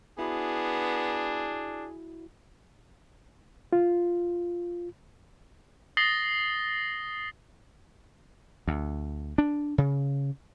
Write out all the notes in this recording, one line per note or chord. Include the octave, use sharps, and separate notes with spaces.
B3 D4 E4 F#4 G#4
F4
D#6 A6 A#6 C7 F#7 G7
D2
D4
C#3